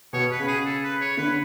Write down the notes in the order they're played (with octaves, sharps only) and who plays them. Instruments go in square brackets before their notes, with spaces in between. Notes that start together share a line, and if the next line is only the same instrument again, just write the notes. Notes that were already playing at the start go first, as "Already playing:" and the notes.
[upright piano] B2 [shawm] C#5
[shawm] B4
[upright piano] C#3
[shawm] G#4
A4
B4
C#5
[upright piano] D3 [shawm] B4